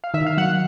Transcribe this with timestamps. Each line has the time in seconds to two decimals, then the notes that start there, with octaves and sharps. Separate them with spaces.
0.04 F5
0.14 D#3 E5
0.26 F5
0.37 F#3 F#5
0.50 F#5